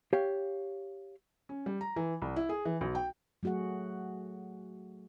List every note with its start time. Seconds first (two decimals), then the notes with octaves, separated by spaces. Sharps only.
0.13 G4 C#5 F5
1.49 C#4
1.66 G3
1.81 A#5
1.96 E3
2.22 C2
2.36 E4
2.49 G#4
2.65 E3
2.81 B1
2.95 G5
3.43 F#3 A3 F#4 G#4 F#5